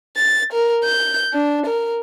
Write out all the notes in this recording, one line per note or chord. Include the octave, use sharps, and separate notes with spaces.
A6
A#4
G6
D4
A#4